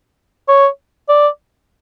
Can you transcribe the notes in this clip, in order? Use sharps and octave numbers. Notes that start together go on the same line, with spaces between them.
C#5
D5